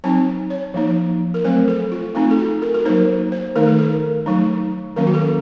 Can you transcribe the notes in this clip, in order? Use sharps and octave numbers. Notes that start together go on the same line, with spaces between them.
F#3 C4 D#4 A5
C#5
F3 A#3 D#4
A#4
F#3 A3 C4 C5
A4
F4
A3 C4 D#4 F4
A4
F#4
A#4
A#4
F#3 A#3 D#4 C5
C5
D#3 A3 D#4 A#4
A4
A#4
F#3 A3 D#4
D#3 F#3 A#3 C#4 A#4
F#4
A4